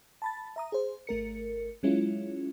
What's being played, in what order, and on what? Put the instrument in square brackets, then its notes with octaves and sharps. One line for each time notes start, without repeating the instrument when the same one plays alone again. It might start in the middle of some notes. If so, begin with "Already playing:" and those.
[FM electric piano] A5 B5 A6
E5 A#5 D#6
G#4 C5
G#1 A3 A#4 C#7
F#3 G#3 C#4 E4 F4